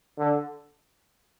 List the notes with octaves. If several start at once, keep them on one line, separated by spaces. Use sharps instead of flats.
D3